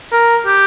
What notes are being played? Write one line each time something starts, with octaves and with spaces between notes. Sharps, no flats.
A#4
G4